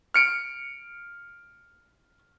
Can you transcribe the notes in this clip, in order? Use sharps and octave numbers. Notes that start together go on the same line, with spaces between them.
F6 C#7 D7